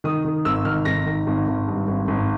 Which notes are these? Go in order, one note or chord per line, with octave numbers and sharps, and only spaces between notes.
D#3 D#6
D#3
G#1 E6
D#3 F6
G#1 A#6
D#3
G#1
G#1
G2
G#1
G#1